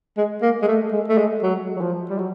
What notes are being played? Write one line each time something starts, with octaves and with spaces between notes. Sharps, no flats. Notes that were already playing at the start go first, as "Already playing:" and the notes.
G#3
A#3
G#3
A3
G#3
A3
G#3
F#3
F#3
F3
G3
F#3